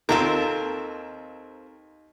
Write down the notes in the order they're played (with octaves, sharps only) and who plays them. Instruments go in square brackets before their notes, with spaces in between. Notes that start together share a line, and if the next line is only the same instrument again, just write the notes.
[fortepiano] D#2 F4 [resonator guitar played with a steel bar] C4 A4 A#4